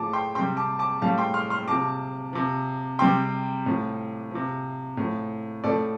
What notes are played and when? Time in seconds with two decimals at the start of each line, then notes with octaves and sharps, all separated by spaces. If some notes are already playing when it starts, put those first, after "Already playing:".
Already playing: A2 F3 A5 D6
0.13 G5 C6
0.35 C3 G5 C6
0.39 G3
0.57 A5 D6
0.79 A5 D6
1.02 A2 G3 F5 A5
1.18 G5 C6
1.34 C6 F6
1.50 C6 F6
1.68 C3 F3 A5 D6
2.33 C3 F3
2.99 C3 G3 G5 C6
3.66 A2 F3
4.31 C3 F3
4.97 A2 F3
5.64 A2 A4 D5
5.69 F3